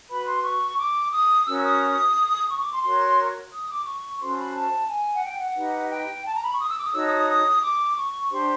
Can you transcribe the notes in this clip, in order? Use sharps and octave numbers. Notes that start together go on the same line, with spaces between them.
F#4 B4 B5
C6
C#6
D6
D#6
C#4 F#4 A#4 E6
E6
D#6
C#6
D6
C6
F#4 A#4 C#5 C6
D#6
D6
C#6
C#4 F#4 A4 C5 C6
B5
A5
G#5
F#5
G5
F#5
D#4 G4 B4
G5
A5
A#5
B5
C#6
D#6
E6
D6
D#6
D#4 F#4 A4 C#5 E6
D#6
D#6
D#6
D6
C#6
D4 G4 C5 C6